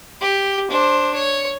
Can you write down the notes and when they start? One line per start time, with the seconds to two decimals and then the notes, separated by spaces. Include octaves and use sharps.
0.21 G4
0.71 D4 C5
1.14 C#5